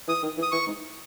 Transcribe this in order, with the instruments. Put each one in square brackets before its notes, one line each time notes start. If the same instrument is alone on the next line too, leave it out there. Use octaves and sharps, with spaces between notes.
[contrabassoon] E3 [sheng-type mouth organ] D#6
[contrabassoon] D#3
E3
[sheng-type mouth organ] D#6
[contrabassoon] E3 [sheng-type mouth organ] C#6
[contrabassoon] G#2